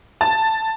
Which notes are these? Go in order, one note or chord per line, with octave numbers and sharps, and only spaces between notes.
A5